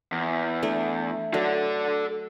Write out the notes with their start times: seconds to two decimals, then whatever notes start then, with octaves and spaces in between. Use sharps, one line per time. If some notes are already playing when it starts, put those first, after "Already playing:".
0.12 E2
0.63 A3 D4
1.34 F#3 A4 D5